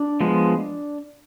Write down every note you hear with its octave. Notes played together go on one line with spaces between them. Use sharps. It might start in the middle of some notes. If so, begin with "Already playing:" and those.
Already playing: D4
F3 G#3 B3